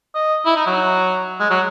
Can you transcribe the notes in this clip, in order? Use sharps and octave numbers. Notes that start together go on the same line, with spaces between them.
D#5
E4
D#4
F#3
G#3
F#3